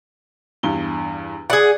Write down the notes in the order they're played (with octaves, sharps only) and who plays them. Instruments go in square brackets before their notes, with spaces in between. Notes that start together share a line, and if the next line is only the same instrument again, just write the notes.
[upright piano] E2 G2 G7
[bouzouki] G#4 F#5 [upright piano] D5 F#7